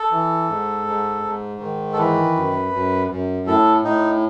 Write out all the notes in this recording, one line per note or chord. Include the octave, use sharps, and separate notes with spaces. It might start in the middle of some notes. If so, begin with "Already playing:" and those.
Already playing: A4
E3
G#2
G#2
G#2
D#3
A4
E3 B4
F#2
F#2
F#2
A2 A4
A2 D#4